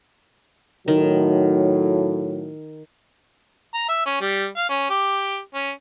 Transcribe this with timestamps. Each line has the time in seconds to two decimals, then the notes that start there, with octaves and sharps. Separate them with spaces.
0.88 A2 D#3 F#3
3.74 A#5
3.89 E5
4.06 C#4
4.21 G3
4.56 F5
4.69 C#4
4.90 G4
5.54 C#4